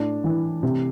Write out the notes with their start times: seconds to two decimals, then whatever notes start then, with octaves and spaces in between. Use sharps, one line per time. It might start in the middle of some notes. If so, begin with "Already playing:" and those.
Already playing: A2 D4
0.24 E3
0.63 C3